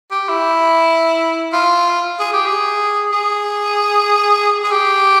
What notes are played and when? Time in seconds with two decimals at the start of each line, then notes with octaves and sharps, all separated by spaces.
0.11 G4
0.28 E4
1.53 F4
2.19 G#4
2.33 G4
2.46 G#4
3.13 G#4
4.64 G#4
4.71 G4